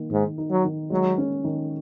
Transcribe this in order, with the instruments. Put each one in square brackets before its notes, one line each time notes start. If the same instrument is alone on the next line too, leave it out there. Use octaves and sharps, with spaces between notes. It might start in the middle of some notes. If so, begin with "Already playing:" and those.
Already playing: [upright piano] D#3 A#3
[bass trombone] G#2 [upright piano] D#3
[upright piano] D#4
[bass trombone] F#3
[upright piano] D#3
[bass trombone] F#3 [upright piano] G#3
[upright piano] C#4
D#3